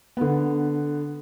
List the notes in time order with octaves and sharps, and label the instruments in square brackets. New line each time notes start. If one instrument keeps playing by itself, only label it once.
[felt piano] D3 B3